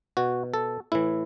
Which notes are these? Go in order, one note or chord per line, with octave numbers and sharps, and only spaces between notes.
B2 F#4
A4
A2 E3 E4